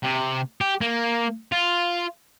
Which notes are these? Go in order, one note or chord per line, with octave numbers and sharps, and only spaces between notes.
C3
G4
A#3
F4